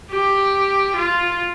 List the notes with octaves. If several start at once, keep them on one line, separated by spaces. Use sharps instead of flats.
G4
F4